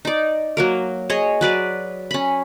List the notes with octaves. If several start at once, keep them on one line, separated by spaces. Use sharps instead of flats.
D#4 D5
F#3 A#3 A#4
G#4 C#5 D#5
F#3 B4 D5
C#4 B5